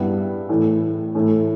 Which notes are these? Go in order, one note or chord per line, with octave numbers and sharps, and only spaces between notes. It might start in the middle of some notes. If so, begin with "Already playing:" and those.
Already playing: G2 G3 B3 E4
A2 E3 A3
A2 E3 A3 E4